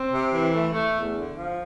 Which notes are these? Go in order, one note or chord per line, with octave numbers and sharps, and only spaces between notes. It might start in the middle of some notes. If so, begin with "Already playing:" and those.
Already playing: C4
C3
E3
A3
A3
E2
D3
F3